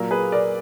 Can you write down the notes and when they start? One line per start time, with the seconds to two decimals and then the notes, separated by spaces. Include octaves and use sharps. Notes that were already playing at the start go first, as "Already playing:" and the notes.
Already playing: A#2 F#3 A#3 A#4
0.11 G#4 B4
0.32 A#4 D5